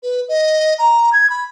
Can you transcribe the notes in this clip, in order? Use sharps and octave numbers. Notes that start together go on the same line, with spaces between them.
B4
D#5
A#5
G#6
B5